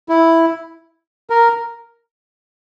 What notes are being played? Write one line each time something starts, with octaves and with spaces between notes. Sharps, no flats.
E4
A#4